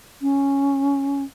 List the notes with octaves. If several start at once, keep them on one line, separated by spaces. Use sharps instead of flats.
C#4